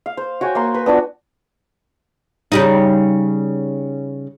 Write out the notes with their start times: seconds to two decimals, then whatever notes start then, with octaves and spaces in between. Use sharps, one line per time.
0.06 F5
0.17 C5
0.41 F#4 C#5 G5 G#5
0.55 A#3 C6
0.74 B4
0.86 B3 D4 F4 F#4
2.52 C#3 G3 D#4